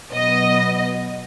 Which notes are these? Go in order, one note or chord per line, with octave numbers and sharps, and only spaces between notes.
B2 F#3 B3 D#5